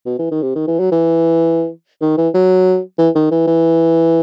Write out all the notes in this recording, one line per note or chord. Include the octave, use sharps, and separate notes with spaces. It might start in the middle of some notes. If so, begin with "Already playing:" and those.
B2
E3
D#3
C3
D#3
E3
F#3
E3
D#3
E3
F#3
E3
D#3
E3
E3